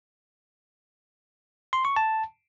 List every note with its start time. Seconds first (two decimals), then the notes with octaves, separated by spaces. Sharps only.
1.73 C6
1.85 C#6
1.96 A5